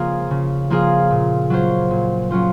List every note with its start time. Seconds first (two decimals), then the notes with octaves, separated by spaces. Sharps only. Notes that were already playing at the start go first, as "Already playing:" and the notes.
Already playing: C#3 F3 A#3 F4 G#4
0.31 C#3
0.70 F3 A#3 F4 G#4
1.11 A#2
1.50 F#3 C#4 F4 C5
1.91 A#2
2.30 F#3 C#4 F4 C5